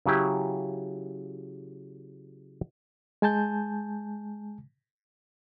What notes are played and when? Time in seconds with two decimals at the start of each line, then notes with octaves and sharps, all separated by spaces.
0.06 C#3 F#3 E4 G4
3.22 G#3 G#5 A5 G6